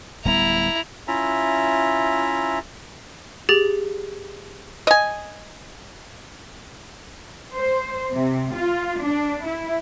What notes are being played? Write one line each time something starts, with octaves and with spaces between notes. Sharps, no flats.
D1 G3 B3 E4 A#5
C#4 E4 F4 E5 A#5
G4 G#4 A6
D#5 G#5
C5
C3
F4
D4
E4